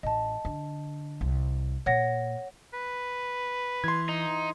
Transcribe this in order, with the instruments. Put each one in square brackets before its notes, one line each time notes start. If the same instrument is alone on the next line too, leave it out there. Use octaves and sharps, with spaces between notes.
[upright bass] A1 [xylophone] D#5 A5
[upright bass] D3
C2
[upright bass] A#2 [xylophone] C#5 F#5 A#6
[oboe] B4
[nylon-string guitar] E3 [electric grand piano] C6 G#6
[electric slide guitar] D#4